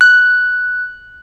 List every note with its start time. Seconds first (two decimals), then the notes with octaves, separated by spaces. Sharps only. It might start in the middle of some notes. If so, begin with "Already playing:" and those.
0.01 F#6